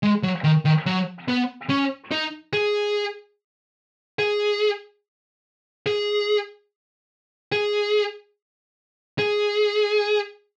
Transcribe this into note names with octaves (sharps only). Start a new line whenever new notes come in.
G#3
F#3
D#3
D#3
F#3
B3
C#4
D#4
G#4
G#4
G#4
G#4
G#4